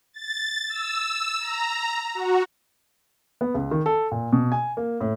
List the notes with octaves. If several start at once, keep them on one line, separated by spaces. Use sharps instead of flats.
A6
E6
A#5
F#4
B3
C#2
D#3
A4
A#2
B2
G#5
A#3
A2